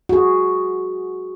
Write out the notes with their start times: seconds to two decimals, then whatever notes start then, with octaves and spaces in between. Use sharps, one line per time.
0.09 F#4 G#4